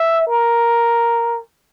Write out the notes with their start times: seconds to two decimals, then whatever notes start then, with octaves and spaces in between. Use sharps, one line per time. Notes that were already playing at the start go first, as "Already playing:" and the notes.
Already playing: E5
0.28 A#4